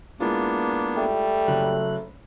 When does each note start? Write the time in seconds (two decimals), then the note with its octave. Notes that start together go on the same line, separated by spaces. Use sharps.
0.20 G#3 A#3 B3 D4 E4 F4
0.97 G3 A3
1.48 F#1 F#2 F#6